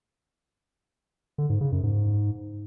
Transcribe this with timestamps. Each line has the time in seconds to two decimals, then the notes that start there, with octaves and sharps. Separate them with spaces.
1.38 D3
1.50 G#2
1.61 C#3
1.72 F#2
1.83 G#2